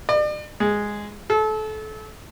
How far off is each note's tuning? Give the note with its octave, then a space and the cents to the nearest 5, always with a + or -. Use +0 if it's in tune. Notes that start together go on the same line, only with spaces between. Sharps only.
D5 +40
G#3 -5
A4 -30